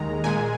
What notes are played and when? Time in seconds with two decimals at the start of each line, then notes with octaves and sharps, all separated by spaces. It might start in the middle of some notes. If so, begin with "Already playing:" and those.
Already playing: D#2 D#3 G#3 A#5
0.24 A#2 G#3 G#5